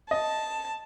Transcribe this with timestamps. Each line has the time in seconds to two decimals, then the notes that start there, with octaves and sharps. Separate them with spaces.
0.11 D#5 A5